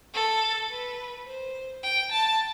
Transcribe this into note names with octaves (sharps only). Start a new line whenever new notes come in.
A4
B4
C5
G5
A5